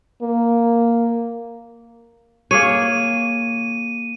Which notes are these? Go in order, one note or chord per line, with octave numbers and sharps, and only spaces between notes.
A#3
A#3 G#4 C#5 D#7